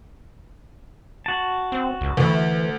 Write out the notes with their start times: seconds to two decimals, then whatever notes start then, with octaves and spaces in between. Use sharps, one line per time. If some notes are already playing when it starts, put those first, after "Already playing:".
1.26 F#4 A5
1.72 C4
2.01 C#2
2.17 D2 E3